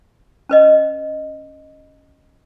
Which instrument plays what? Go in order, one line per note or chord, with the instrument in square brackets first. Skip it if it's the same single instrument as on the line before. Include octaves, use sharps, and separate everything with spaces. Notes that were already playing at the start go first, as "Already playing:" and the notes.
[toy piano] C#4 B4 D#5